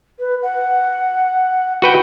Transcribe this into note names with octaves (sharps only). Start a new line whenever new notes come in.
B4
F#5
F#4 B4 F#5 G5